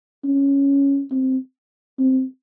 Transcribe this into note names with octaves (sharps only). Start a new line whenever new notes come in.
C#4
C4
C4